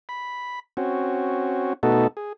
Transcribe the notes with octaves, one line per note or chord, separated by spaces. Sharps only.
B5
C4 C#4 F#4
B2 A3 B3 D#4 F#4 A4
G#4